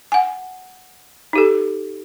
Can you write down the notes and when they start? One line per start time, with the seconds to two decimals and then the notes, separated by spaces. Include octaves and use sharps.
0.12 F#5 G#5
1.33 D#4 G4 A4